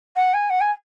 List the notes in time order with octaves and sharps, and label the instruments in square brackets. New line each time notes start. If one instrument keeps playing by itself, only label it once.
[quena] F#5
G#5
F#5
G#5